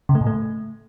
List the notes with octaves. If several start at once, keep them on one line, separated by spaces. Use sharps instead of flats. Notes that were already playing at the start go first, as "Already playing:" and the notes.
C#3
A3
A2
A3